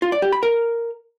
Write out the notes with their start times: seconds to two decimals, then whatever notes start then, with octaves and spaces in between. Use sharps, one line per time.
0.02 F4
0.12 D5
0.22 G4
0.32 B5
0.43 A#4